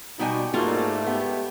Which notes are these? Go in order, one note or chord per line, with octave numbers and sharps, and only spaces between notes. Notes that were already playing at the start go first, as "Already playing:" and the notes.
B2 G3 B3 D#4 F#4 G#5
G#2 G3 A3 A#3 F4 F#4
B3 G4